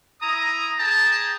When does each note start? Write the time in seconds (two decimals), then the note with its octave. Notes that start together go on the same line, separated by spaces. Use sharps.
0.22 E4 A#5 D#6
0.80 G#4 G5 A5 A#5